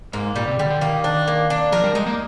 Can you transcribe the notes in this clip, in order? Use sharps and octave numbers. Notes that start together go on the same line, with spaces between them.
G#2 A#3
A#2 G3
C3
D3 G3
D3
D#3 A#3
D4
A#3
D4
F3 A#4
G3
G#3 D#4
A#3